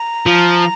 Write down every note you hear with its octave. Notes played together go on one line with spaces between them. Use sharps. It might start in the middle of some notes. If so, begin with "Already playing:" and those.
Already playing: A#5
F3